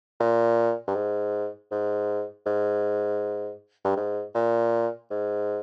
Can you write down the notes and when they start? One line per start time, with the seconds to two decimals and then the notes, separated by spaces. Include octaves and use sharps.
0.20 A#2
0.87 G2
0.95 G#2
1.71 G#2
2.46 G#2
3.85 G2
3.96 G#2
4.35 A#2
5.10 G#2